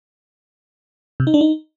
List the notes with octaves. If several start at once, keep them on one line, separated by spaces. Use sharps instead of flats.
C3
D#4
D4
D#4